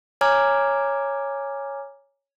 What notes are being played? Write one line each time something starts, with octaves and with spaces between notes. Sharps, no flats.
C#5 G#5 A#5 D6 F6 G#6